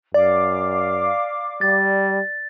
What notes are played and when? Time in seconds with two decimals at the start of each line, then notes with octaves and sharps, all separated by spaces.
0.14 F#2 D5 F5 D6
1.61 G3 A6